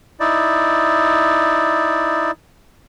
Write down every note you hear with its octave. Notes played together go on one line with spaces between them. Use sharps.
D#4 E4 D5